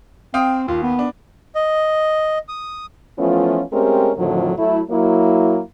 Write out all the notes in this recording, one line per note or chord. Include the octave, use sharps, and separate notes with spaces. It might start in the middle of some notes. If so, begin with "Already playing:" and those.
C4 F5 G5 D#6
D#2 F4
B3
D4
D#5
D#6
E3 F3 A3 B3 C#4 F4
G#3 A3 C4 C#4 G4 A#4
F2 A2 D3 D#3 F3 F#3
F#3 A3 E4
F#3 A#3 E4